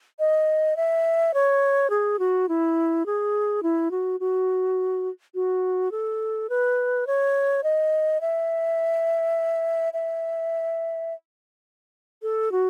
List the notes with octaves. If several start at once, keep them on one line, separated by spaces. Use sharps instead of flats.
D#5
E5
C#5
G#4
F#4
E4
G#4
E4
F#4
F#4
F#4
A4
B4
C#5
D#5
E5
E5
A4
F#4